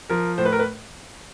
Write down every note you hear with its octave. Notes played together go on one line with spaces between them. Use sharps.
F3 A#4
A2 C5
B4
A#4
B4